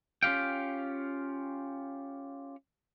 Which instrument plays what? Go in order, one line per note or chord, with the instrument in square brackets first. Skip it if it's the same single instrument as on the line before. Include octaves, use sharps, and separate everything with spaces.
[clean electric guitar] C#4 F4 G4 F5 G5